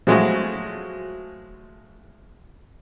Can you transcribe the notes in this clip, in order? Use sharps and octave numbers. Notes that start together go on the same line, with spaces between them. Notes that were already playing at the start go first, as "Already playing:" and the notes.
F3 F#3 G#3 A3 E4 F#4